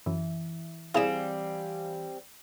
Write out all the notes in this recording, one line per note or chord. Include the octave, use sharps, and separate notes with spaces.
F#2 E3
G3 C4 E4 G#4 F5 G#5 E7